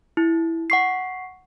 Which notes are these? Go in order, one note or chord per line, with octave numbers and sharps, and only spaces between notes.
E4
F#5 C#6 C7